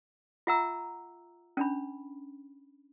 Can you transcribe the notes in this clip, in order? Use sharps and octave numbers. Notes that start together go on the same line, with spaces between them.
F4 E5 F#5 A#5 E6
C#4 D4 B5